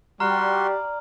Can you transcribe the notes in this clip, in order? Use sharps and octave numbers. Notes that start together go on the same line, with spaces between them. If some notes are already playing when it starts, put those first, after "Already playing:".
G3 F#4 D5 A#5 C6 F6